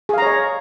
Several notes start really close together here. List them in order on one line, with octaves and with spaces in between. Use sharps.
G#4 F5 A#5 C#5 D#5